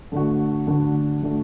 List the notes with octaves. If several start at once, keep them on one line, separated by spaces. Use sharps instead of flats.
D3 A3 D4 F#4
D3 A3 D4 F#4
D3 A3 D4 F#4